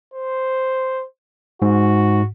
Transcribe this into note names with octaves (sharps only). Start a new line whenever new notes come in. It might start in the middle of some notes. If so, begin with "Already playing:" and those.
C5
G#2 F#4